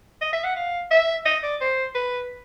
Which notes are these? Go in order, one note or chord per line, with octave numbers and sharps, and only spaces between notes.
D#5
E5
F#5
F5
E5
D#5
D5
C5
B4